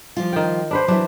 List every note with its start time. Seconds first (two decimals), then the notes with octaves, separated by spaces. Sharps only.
0.17 F3 G3 F4
0.33 D#3 G5
0.71 D4 B4 C5
0.88 E3 F#3 D4